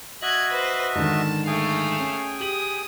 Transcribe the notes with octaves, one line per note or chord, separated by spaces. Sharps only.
F#4 D#5 E5 F#6 G#6
B4 C5
G#2 D3 D#3 A5
A3 G#4 F5 G5 G#5
C#4
G4 D#6 F#7